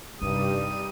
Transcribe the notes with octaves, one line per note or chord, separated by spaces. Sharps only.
G2 C3 G3 D#4 D#6